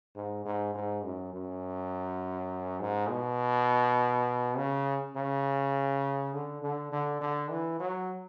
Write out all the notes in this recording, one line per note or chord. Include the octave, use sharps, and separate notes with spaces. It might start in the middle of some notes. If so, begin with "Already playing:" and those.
G#2
G#2
G#2
F#2
F#2
G#2
B2
C#3
C#3
D3
D3
D3
D3
E3
F#3